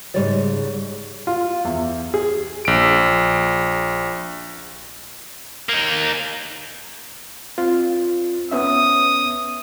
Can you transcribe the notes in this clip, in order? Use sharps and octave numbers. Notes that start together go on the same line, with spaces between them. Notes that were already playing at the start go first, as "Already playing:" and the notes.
G#2 C#3 G3 C#5 D5
F4
E2
G#4
A#1 D7
A#3 D#4
C4 F4
B3 C#4 E5 D#6